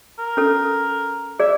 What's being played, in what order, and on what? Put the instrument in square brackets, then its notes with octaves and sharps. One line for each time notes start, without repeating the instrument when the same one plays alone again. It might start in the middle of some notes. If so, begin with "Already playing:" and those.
[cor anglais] A#4
[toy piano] C#4 A4
[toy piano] G#4 D5 [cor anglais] E5